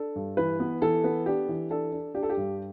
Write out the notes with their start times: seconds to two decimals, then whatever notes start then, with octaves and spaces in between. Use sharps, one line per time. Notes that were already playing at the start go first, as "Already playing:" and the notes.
Already playing: D4 A4
0.15 G2
0.37 E3 B4
0.60 B3
0.82 E3 A4
1.04 B3
1.26 D4 G4
1.49 E3
1.70 D4 A4
1.92 D4
2.15 D4 G4
2.23 A4
2.30 G4
2.37 G2